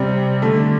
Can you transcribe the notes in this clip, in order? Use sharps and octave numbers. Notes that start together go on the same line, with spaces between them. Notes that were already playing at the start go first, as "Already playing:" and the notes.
Already playing: C3 G3
D3 A3